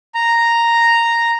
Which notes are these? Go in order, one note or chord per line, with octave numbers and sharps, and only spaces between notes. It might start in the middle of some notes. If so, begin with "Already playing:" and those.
A#5